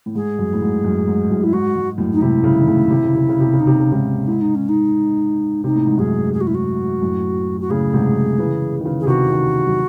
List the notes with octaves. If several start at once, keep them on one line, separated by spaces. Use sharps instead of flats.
A2
G#2 G#4
F#2
A2
G#2
F#2
G#2
F#2 A2
E4
G#2 F#4
G#2
F#2 A2
D#4
G#2 C3 E4
A2 C#3
D#3
A2 C#3
C3
C#3
C3
C#3
C3
C#3
D#4
C3
C#3
G#2 C3 C#4
G#2 E4
D#4
C#4
D#4
C3 D#4
A2
G#2
F#2 A2 G#4
G#4
F#4
E4
F#4
F#2 A2
F#4
A2 C#3 G#4
G#2 C3
G#2
C#3 E3
D#3
C#3 E3
G#4
C3 D#3 F#4
C3 D#3
F#3